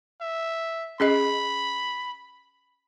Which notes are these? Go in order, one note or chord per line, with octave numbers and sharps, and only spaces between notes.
E5
C#4 G#4 D#5 B5